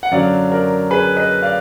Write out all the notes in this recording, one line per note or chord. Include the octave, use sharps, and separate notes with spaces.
F#5
F#2 D3 F#3 D5 F5
A#4 D5
G#4 B4
B4 D#5
D5 F5